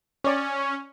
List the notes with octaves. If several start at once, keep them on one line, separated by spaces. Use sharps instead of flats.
C#4 C#5 D5